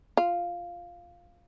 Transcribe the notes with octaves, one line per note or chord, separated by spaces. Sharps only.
F4